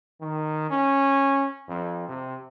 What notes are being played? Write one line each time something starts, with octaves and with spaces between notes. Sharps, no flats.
D#3
C#4
F2
C3